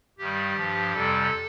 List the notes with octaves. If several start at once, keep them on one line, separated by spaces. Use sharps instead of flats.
G2 D#3 G3 G4
G2 F3
F2 C3 G3 A4